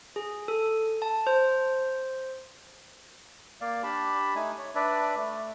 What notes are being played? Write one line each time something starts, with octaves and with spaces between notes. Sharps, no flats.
G#4
A4
A5
C5
A#3 D5 F5
D4 G4 A5 B5
A3 D#4 G#5
C#5
D4 B4 D5 E5
A3